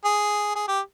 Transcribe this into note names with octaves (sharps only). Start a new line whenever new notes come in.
G#4
G#4
G4